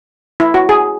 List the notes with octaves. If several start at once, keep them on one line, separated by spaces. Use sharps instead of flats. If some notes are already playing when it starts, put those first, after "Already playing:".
E4
F#4
G#4